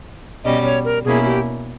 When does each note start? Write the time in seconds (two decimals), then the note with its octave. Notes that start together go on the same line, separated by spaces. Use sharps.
0.44 B2 G3 C#4 D#5
0.65 C#5
0.85 A#4
1.05 B2 A#3 C#4 E4 G#4
1.26 G4